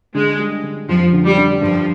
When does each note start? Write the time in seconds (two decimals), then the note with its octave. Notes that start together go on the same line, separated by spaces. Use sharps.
0.15 D3 G#3
0.39 G3
0.63 D3
0.88 F2 F3
1.13 D3
1.25 G3
1.37 D3
1.61 G2 F3